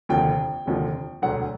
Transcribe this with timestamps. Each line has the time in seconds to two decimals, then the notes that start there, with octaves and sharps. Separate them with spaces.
0.09 F1 D#2 D3 F3 G5
0.66 F1 D#2 D3 F3
1.22 E1 D2 D3 F#3 F#5